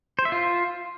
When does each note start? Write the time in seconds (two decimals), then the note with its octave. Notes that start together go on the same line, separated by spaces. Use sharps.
0.19 C5
0.25 E5
0.32 F4